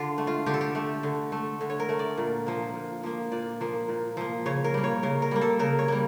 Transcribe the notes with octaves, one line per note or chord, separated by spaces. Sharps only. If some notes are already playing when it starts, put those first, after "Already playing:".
Already playing: D3 D4 F4
A3
F4
D3 G4
A4
G4
A3
D3
A3
D3
C#5
A#4
A3
D5
A#2
F3 A#3
A#2
F3 A#3
A#2 D5
F3 A#3
A#2
F3 A#3
C#3 C#5
A#4
G3 A#3
C#5
C#3 A#4
A#4
G3 A#3
A4
C#3 A#4
C#5
G3 A#3